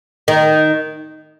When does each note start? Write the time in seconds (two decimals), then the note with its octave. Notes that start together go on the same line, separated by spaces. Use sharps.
0.28 D#3